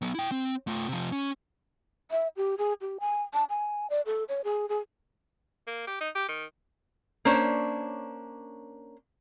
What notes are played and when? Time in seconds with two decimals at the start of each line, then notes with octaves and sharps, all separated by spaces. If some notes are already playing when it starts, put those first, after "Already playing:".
0.02 F#3 B3
0.15 E4 G5
0.31 C4
0.67 A3 F4
0.89 C3 F3
1.12 C#4
2.11 E5
2.37 G4
2.58 G#4
2.81 G4
3.00 G#5
3.34 A5
3.50 G#5
3.90 D5
4.06 A4
4.29 C#5
4.44 G#4
4.69 G#4
5.67 A#3
5.87 G4
6.01 D#4
6.15 G4
6.29 D#3
7.25 A#3 C#4 D4 C5 C#5